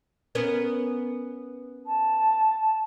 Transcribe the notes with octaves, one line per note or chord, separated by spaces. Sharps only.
B3 C#4 A#4
A5